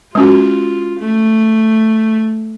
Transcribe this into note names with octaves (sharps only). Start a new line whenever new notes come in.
G#3 C#4 F4 F#4
A3